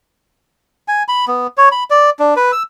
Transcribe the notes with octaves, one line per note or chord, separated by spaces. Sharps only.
G#5
B5
B3
C#5
B5
D5
D4
B4
E6